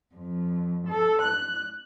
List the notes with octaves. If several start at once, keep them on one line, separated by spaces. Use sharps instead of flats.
F2
A4
F#6